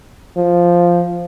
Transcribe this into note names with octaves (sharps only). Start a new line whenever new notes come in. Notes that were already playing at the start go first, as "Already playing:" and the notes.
F3